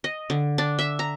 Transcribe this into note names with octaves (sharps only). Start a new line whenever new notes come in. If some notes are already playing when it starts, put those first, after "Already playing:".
D#5
D3
D4
E5
A#5